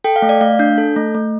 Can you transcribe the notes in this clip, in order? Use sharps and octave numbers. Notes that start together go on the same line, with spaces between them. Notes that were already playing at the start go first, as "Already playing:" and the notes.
A4 G5
F5
A3
D5
A3 F5
D4 G6
A4
A3
A3